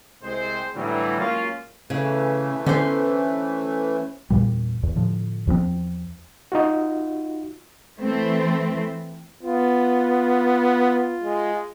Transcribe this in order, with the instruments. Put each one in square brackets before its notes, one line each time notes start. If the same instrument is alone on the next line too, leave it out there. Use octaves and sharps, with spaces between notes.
[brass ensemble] C2 G#3 C4 C5
A2 D3 E3 F#3 G3
F#3 G#3 A#3 C#4 F4
[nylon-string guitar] C#3 [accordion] E3 A3
[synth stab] D3 [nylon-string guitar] C#4 C5
[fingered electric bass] E2 A#2 G3
E2
A2 D3 F3
E2 F3 G#3 C4
[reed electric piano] D#4 F4 F#4
[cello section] E3 A3 C4
[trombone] B3 [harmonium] F4
[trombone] G#3